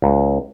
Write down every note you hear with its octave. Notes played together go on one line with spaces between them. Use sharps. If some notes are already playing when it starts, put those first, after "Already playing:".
C#2